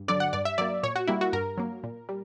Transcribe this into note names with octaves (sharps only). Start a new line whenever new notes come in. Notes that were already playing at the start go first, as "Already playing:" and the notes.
Already playing: G2
D3 F#3 D5
F#5
G2 D5
E5
F#3 A#3 D5
A#2 C#5
F#4
G3 A#3 E4
F#4
G2 A#4
F#3 A#3
A#2
G3